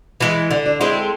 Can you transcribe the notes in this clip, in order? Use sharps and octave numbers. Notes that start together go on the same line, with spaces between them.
E3 G#3 E4
D3 D4
D4
G#3 C4 E4
A4